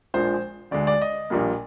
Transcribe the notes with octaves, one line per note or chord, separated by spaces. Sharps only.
A#1 A#2 F3 G#3 C5
D2 D3 G#3 D5
D5
D#5
A#1 A#2 G3 A#3